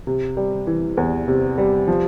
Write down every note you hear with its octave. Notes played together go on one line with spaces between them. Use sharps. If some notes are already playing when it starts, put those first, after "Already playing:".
C3
G3
E3
E2
C3
G3
F3